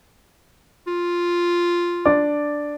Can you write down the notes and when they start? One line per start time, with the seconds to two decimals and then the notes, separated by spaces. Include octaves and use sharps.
0.87 F4
2.06 D4 D5